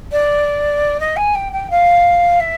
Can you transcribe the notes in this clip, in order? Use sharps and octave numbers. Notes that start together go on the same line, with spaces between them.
D5
D#5
G#5
G5
G5
F5
E5